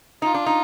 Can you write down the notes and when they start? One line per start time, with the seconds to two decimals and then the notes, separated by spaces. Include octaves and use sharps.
0.22 D#4 F4
0.34 D4
0.46 D#4